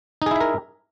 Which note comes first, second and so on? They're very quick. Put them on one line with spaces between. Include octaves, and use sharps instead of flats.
D#4 G#4 E4 E5 A#4